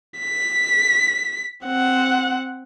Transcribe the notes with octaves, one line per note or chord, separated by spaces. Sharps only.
B6
C4 F#5